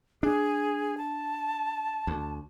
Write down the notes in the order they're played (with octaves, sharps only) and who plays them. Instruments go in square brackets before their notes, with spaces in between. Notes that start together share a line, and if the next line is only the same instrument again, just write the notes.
[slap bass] D4 [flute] G#4
[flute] A5
[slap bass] D2